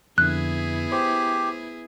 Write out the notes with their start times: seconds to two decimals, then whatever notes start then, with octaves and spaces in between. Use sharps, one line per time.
0.18 F2 D3 B3 E4 G#4 F#6
0.92 G4 C5